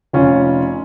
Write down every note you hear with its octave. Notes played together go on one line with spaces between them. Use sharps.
F1 C#4 F4